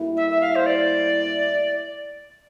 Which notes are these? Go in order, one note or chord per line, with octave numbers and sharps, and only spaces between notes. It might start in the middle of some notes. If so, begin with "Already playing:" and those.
Already playing: A2 G3 A#3 E4
E5
E5
F5
C5
D5